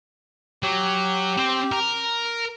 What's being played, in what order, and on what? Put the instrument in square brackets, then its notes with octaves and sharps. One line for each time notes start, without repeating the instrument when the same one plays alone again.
[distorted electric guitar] F#3 [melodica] G4
[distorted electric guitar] C4 C5
A#4